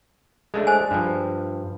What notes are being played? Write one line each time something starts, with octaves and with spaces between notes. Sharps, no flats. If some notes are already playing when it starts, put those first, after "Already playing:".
G#3 A3 D4
C5 G#5
G2 F3